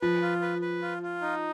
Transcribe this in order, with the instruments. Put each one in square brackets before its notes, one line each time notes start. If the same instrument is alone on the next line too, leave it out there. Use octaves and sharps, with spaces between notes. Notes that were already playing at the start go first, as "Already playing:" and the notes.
[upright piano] F3 [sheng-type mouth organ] B4
[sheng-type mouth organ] F4
B4
B4
F4
F4
D#4